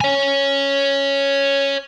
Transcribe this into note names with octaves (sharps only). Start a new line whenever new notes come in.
C#5 G#5